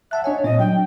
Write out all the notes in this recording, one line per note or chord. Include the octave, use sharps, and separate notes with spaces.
E5 F#5 A5 F#6
D4 C#5 D#5 G#5
A#2 C4 C#5 D#5
F#3 D4 G5